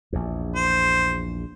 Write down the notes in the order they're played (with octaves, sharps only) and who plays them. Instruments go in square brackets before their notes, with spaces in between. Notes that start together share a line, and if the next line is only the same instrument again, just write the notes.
[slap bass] A#1 E2
[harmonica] C5